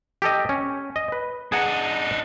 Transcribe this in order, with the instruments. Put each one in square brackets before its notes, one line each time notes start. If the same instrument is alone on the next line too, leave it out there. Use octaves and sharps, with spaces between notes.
[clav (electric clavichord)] G4 A4 D#5
C#4
D#5
B4
[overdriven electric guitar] D4 D#4 [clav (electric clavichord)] G#4 F#5 A#5